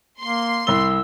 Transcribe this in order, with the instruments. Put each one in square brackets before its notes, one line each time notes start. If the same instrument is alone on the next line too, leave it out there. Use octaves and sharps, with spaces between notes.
[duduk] A#3 [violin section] C6
[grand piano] C2 G7 [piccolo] E6